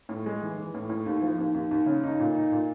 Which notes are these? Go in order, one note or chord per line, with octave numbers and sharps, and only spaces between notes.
A2
G#3
E3
E3
A2
A2
D#2
F3
D#2
D#2
D#2
C#3
D#4
A#2
D#4
A#2